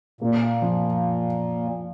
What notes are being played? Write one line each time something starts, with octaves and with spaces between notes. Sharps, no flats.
A#2 A#3
F3